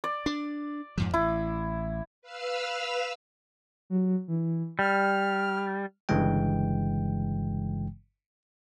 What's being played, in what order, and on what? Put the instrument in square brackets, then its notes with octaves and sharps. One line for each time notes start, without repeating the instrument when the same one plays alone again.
[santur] D5
[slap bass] D4 [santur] D5
[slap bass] F2 G#2 F3
[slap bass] A1 [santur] E4
[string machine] B4 F5 E6 F6
[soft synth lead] F#3
E3
[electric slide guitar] G3 [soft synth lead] F6
[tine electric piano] G1 G2 C#3 E3 G#3 G5